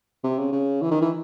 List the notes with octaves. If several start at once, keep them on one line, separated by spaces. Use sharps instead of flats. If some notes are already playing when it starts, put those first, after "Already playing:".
C3
C#3
C#3
E3
D#3
E3